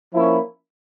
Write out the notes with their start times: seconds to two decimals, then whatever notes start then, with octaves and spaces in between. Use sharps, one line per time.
0.13 F3 A#3 C#4 E4